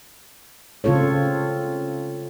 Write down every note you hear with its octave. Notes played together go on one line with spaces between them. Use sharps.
C#3 C4 F4 A4 C#5